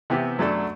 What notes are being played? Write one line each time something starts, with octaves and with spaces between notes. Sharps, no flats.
C3 E3 B3 E4 G4
F#2 F#3 A3 D4 A4